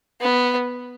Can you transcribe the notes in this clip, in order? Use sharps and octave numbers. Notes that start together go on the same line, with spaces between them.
B3